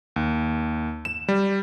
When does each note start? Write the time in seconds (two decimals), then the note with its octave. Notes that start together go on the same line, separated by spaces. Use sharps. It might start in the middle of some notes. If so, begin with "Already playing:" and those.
0.16 D#2
1.05 E7
1.28 G3